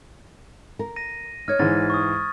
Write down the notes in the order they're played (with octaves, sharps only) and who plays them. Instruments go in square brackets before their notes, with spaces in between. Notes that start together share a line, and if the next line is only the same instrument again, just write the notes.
[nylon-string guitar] A#4
[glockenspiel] A#6 D#7
[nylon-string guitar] D#4 C#5 [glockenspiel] F6 G#6
[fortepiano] G#2 E3 [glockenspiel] A6
[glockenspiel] C#6 D#6